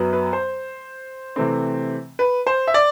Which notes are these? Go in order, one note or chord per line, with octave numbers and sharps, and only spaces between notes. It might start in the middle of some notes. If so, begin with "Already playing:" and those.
Already playing: F#2 F#3 B3
B4
C5
C3 E3 A3 C4
B4
C5
E5
D5